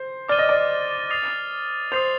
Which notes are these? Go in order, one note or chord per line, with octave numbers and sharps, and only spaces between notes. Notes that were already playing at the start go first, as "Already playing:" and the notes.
Already playing: C5
D5 D6 F6 A6 D#7 G7
D#5
D5
D#6 A6 C7 F7
C5 D#6 A6 C7 F7